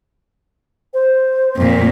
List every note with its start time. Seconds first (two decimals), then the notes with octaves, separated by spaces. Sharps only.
0.94 C5
1.57 F2 A#2